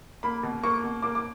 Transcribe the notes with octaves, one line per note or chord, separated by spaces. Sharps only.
A#3 B5
B2
A#3 C#6
B2
A#3 D6
D6